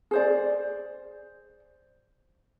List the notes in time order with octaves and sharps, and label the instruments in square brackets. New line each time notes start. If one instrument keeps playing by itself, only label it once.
[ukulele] G#4 C5 D5